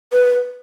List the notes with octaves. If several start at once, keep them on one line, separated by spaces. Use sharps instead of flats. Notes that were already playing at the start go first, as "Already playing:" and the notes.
B4